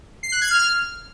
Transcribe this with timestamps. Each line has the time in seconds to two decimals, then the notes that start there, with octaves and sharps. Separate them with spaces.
0.23 C7
0.32 F#6
0.41 G#6
0.50 F6